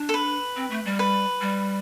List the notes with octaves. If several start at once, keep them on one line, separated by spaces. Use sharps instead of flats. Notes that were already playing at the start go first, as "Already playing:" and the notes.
Already playing: D4
A4
B4
C4
A3
G3
B4
G3